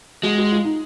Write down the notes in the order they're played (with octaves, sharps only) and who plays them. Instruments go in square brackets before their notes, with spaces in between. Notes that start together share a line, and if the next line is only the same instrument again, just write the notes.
[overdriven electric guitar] G#3 [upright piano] F#4
[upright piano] F#4
F4
D#4